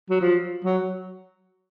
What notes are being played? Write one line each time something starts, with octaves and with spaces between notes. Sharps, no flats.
F#3
F3
F#3